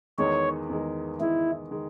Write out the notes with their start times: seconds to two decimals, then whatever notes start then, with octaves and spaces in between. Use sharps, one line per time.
0.18 E2 D#3 G#3 C#5
0.69 E2 D#3 G#3
1.20 E2 D#3 G#3 E4
1.71 D#3 G#3